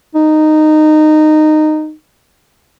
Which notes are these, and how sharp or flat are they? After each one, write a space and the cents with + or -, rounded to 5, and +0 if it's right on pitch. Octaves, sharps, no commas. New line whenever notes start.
D#4 -15